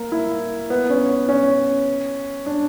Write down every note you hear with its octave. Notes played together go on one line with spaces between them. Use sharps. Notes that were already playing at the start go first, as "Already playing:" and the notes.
Already playing: A#3
E4
B3
C#4
C#4
D4